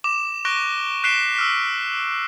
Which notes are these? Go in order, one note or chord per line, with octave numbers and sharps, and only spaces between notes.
D6 E7
C#6 F#6 A#6 D7 G7
F#6 B6 C7 D7 E7 G7
E6 F6 B6